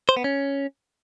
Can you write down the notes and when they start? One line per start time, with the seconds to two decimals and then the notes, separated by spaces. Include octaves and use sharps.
0.09 C5
0.17 B3
0.24 C#4